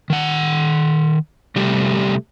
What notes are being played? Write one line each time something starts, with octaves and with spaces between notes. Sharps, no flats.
D#3 F#5
C3 G3 A3 G4